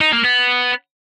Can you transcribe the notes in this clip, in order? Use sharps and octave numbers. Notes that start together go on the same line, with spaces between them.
D#4
A#3
B3